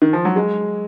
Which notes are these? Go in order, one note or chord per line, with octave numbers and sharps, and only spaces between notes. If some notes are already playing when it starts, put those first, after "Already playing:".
D#3
F3
F#3
G#3